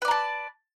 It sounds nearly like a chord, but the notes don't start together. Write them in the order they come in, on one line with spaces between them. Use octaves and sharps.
B4 D5 A#5 A5